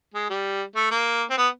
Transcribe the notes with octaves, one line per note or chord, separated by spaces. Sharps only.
G#3
G3
A3
A#3
C4
B3